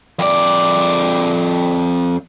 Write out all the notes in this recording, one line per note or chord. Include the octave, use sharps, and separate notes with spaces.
F2 D5